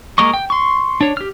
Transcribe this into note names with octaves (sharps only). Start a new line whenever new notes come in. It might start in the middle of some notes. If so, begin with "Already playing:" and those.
G#3 A#3 A#4 D#5 C#6
G5
C6 C#6
D4 C#5
G4 F6